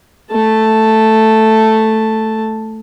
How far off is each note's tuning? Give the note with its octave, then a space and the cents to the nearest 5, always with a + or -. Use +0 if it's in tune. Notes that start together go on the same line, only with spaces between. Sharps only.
A3 +0 A5 +0